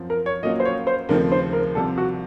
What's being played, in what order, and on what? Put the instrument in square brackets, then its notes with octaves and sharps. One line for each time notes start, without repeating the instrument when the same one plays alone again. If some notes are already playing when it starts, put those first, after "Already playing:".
Already playing: [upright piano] F#2 F3 C4
[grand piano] A#4
C#5
[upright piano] A#2 F#3 A#3 C#4 F4 [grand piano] D#5
[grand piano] C5
C#5
C5
[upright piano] D#2 C#3 F3 A3 C4 [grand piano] A#4
[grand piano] C5
A#4
[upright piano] C2 C3 F3 [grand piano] A4
[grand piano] F#4